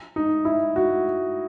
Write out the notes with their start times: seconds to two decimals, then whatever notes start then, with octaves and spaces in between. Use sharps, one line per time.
0.16 D#4
0.45 E4
0.76 F#4